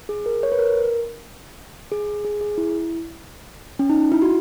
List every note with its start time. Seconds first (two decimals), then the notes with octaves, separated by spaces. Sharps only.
0.09 G#4
0.26 A#4
0.43 C#5
0.52 B4
0.59 A#4
1.92 G#4
2.25 G#4
2.41 G#4
2.58 E4
3.79 C#4
3.90 D#4
4.12 E4
4.22 F#4